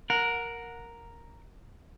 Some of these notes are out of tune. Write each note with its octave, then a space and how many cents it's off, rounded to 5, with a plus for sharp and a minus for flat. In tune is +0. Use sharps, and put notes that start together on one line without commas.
A#4 +0 F#5 -20